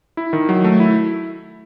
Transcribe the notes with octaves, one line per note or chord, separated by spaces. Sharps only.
E4
D#3
F#3
A3
E4